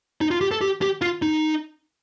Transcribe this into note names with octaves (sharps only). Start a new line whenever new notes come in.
D#4
F4
G4
A4
G4
G4
F4
D#4